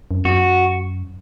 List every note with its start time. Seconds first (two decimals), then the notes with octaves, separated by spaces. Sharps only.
0.11 F#2
0.25 F#2 F#4